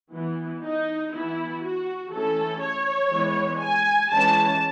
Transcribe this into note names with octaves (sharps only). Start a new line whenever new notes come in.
E3 B3
D#4
E3 B3 E4
F#4
E3 A3 C#4 A4
C#5
E3 G#3 B3
G#5
E3 G#3 C#4 A5